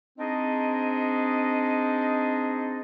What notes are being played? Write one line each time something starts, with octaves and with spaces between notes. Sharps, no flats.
C4 D4 D#4 G#4 D#5